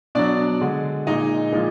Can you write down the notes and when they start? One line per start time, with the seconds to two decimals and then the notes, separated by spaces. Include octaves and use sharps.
0.15 B2 F#3 D4 D5
0.61 D3 G#3
1.07 A#2 G#3 D#4 D#5
1.52 A#2 F3 G#3